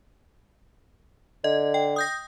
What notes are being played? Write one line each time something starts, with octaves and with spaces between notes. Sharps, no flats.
D3 D#5
G5
D#6 G6 A#6